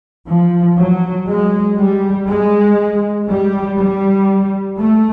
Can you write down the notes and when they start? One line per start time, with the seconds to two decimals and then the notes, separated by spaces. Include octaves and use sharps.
0.29 F3
0.79 F#3
1.29 G#3
1.79 G3
2.28 G#3
3.29 G3
3.78 G3
4.78 A3